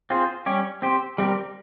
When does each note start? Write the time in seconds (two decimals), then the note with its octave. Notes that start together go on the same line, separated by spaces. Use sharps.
0.10 C4 F4 G#4 C5
0.46 G3 C#4 G4 C#5
0.82 C4 G4 C5
1.18 G3 C4 G4 A#4